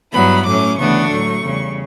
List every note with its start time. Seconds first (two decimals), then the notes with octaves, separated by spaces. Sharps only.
0.12 G2 F#3 B3 E4 B5
0.46 A2 F#3 A3 C#4 D6
0.78 D2 C#3 E3 B3 D4 C#6
1.10 A2 F#3 A3
1.43 E2 C#3 G3